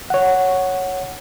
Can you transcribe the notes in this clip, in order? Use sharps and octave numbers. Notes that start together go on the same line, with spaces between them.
C#5 F#5